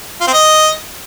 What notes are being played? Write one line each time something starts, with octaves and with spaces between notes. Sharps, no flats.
F4
C4
D#5